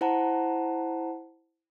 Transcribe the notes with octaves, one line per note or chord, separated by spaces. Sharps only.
E4 C5 F#5 A5 A#5